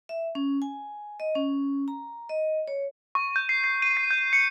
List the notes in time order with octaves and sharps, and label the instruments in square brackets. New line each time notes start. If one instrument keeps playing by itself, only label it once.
[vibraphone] E5
C#4
G#5
D#5
C#4
A#5
D#5
C#5
[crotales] C#6
G6
C7
C7
D#7
C7
G6
C#7